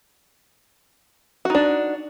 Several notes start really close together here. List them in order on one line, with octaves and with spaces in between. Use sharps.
F#4 D#4 D4